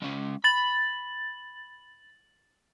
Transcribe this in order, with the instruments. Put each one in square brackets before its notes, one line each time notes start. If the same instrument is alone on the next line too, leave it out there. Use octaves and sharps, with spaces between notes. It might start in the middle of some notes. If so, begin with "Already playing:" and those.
[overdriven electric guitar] G#3 C#4
[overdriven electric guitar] B5 [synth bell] A6 F#7